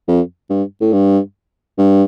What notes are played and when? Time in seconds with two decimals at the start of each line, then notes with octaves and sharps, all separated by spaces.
0.08 F2
0.50 G2
0.81 A2
0.93 G2
1.78 G2